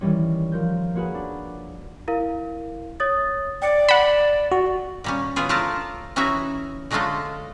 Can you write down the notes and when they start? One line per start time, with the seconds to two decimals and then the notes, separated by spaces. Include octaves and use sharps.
0.01 D#3 E3 G3 C#4
0.52 F3 A#4 G6
0.95 A#3 C#4 F#4 G#4 B4
1.15 D4
2.08 E4 A#4 F5
3.00 C#5 D#6 A6
3.62 D5 G5 C#7
3.89 F#5 B5 E7 F#7
4.52 F#4
5.04 A#2 G3 C#4
5.36 C#3 E3 B3 F4 G#4
5.49 A3 D4 F4 A#4 A5
6.16 E3 C#4 D#4 E4 F#4 E5
6.91 D3 F#3 G#3 A3 F4 A4